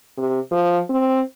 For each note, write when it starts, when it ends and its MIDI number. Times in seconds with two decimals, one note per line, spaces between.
0.18 0.39 48
0.51 0.80 53
0.90 1.21 60